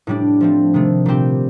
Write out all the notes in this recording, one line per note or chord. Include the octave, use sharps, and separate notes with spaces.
A2 G3 D4
F3 A3 C4
C3 D#3 A3
A#2 G3 C4 G4